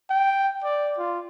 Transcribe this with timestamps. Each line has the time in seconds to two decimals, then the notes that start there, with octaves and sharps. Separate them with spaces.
0.10 G5
0.64 D5
0.98 F4